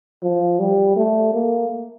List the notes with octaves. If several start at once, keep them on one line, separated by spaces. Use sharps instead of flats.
F3
G3
A3
A#3